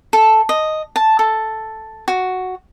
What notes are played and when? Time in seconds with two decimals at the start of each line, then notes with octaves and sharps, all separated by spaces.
0.13 A4
0.49 D#5
0.96 A5
1.19 A4
2.08 F#4